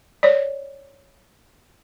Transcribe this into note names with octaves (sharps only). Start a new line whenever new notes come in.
C#5 D5